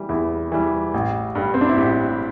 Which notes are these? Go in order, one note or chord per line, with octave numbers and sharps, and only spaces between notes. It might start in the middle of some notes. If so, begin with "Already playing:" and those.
Already playing: E3 G3
E2 E4
E3 G3
A1
G2 G3
C4
D4
E4
A1 G4